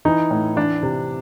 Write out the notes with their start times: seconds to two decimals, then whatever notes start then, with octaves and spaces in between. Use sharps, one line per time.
0.05 E3 D#4
0.31 A2
0.56 E3 D4
0.83 C3